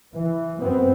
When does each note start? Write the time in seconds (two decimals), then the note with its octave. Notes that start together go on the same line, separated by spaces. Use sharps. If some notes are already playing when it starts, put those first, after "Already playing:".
0.15 E3
0.61 F#2 B3 C4